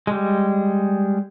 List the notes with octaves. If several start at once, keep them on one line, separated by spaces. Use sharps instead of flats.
G3 G#3